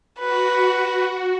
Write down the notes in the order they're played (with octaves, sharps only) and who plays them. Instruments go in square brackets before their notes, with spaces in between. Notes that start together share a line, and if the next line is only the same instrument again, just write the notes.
[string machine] F#4 [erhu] B4